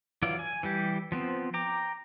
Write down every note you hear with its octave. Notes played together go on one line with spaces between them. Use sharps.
E3 F#3 F4 D5
G#5
E3 G3 G4
F3 B3 C4
G5 A#5 D6